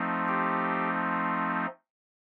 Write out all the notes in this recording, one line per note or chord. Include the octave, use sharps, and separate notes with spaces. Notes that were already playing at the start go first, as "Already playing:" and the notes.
Already playing: F3 A3 C4 D#4
G4